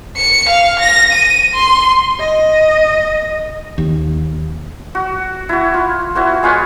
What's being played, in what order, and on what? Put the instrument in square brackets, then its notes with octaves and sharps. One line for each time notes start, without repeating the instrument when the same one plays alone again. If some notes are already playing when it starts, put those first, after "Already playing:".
[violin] C#7
F5
A#6
D#7
C6
[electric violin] D#5
[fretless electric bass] D#2
[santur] F#4
E4 F#4
F4
E4 F#4 C5
G#3 F4 B4 C#5